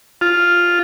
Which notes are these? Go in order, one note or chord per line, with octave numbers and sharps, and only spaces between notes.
F4